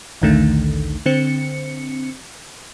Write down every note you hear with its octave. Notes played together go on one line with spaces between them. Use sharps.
A#1 D#2 D3 D#3 A3
D3 C4 C#7